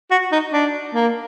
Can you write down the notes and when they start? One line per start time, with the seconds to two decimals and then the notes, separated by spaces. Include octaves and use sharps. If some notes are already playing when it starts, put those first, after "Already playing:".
0.11 F#4
0.32 D#4
0.53 D4
0.94 A#3